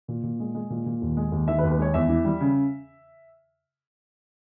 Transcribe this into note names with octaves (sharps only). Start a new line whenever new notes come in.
A#2
A#2
G#3
G#3
A#2
A#2
D#2
G#3
D#2
D#3 E5
B4
D#2
B4
G#3 C#5
E2 E5
E3
G3
C#3